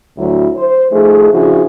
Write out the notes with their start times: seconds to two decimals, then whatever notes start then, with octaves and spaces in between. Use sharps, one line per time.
0.18 D2 F#3 E4
0.55 C5
0.92 F3 A3 D#4 G#4
1.33 C#3 F3 D4 E4 F#4 G#4